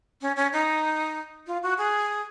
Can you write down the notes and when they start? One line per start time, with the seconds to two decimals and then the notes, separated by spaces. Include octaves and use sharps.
0.21 C#4
0.36 C#4
0.53 D#4
1.47 F4
1.63 F#4
1.78 G#4